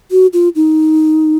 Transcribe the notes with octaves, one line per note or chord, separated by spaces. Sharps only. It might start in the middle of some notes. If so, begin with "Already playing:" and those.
F#4
F4
D#4